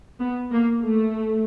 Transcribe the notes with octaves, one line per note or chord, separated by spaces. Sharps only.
B3
A#3
A3